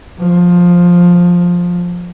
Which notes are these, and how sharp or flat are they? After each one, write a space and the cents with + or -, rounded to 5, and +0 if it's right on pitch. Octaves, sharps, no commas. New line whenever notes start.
F3 +10